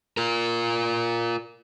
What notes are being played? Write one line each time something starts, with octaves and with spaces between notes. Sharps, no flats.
F4 A#4